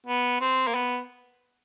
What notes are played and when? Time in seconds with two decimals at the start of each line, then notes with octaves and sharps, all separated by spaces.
0.07 B3
0.41 C4
0.67 A#3
0.75 B3